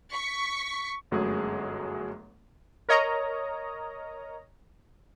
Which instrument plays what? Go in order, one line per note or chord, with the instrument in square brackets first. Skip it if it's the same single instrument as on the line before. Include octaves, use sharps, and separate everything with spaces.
[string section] C#6 B6
[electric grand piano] G1 F#2 F#3 G#3 A3 G#4
[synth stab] A#4 C#5 D#5 A#5